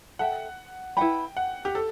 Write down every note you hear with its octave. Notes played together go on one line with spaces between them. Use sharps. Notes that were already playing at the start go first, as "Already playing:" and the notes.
A4 E5 F#5 G5
E4 B4 F#5 G5 B5
F#5
G4
A4 C5